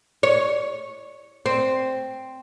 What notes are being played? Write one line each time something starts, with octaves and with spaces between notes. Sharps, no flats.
C#5
C4